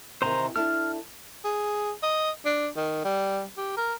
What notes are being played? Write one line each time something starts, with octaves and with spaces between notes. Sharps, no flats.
C3 D#3 E3 C5 A#5
D4 E4 A4 F6
G#4
D#5
D4
D#3
G3
G4
A#4